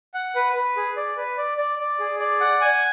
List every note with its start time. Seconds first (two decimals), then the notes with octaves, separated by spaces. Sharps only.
0.14 F#5
0.35 B4
0.55 B4
0.77 G#4
0.97 D5
1.17 B4
1.38 D5
1.58 D5
1.79 D5
2.00 G#4
2.20 D5
2.40 F#5
2.61 G#5